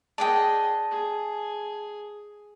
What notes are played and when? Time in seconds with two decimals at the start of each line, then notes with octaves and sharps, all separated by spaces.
0.18 G#4 D5 D#5 F#5 G5 A5
0.91 G#4